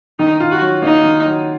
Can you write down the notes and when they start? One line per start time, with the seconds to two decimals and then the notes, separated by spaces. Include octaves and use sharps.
0.19 D#3 D#4
0.40 F4
0.51 F#4
0.61 F#3
0.82 A#3 D#4
1.03 D#3
1.26 F#3